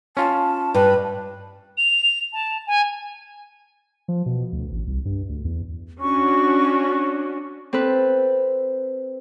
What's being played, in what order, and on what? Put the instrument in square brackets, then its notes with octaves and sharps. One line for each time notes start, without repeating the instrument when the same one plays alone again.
[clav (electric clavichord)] C#4 F4 [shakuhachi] A5
[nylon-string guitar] G2 [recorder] B4
[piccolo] F7
A5
G#5
[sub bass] F3
B2
D2
A1
C2
G2
D2
E2
[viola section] C#4 D4 F#4 [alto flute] C#6
[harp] C4 A4 B4